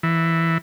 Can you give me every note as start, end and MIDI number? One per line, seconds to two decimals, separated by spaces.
0.03 0.58 52